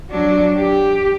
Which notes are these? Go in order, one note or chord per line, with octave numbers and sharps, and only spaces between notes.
F#3 D4
G4